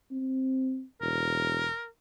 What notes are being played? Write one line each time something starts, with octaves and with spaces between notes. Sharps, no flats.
C4
E1 A#4